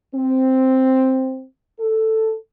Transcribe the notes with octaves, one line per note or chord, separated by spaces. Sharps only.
C4
A4